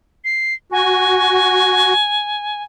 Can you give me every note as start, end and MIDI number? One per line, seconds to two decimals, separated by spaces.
0.25 0.54 96
0.72 1.93 66
0.72 2.63 80